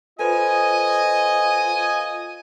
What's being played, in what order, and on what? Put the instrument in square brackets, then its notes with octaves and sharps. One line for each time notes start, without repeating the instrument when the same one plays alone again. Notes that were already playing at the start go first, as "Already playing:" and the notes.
[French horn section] F4 [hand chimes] A4 B4 C5 [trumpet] D#5 [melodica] G#5